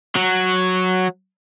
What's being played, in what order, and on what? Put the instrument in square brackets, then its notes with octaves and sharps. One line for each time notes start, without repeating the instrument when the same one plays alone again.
[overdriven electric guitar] F#3